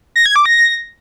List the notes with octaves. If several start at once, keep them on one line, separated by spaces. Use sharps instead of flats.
A#6
G#6
D6
A#6